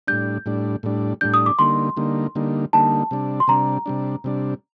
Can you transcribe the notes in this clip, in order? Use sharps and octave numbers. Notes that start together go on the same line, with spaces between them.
A2 G3 D4 G6
A2 G3 D4
A2 G3 D4
A2 G3 D4 G6
D#6
D6
D3 G3 A#3 D#4 C6
D3 G3 A#3 D#4
D3 G3 A#3 D#4
D3 G3 A#3 D#4 A5
C3 G3 D4
C6
C3 G3 D4 A#5
C3 G3 D4
C3 G3 D4